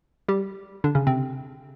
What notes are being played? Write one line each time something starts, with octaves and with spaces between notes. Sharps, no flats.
G3 G4
D3 D4
C#3 C#4
C3 C4